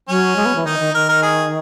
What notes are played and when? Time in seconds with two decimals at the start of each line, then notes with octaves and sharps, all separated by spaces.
0.08 F#3 C#4
0.36 G#3
0.46 B3
0.56 E3
0.65 D#3 D#4
0.79 D#3
0.94 D#3 A#4
1.09 A#4
1.22 G#4